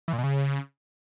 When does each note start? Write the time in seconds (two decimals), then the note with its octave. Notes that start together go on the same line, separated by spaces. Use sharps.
0.08 E3
0.13 A#2
0.18 B2
0.24 C#3